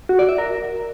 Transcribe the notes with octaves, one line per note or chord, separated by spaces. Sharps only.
F#4
D5
E5
A#4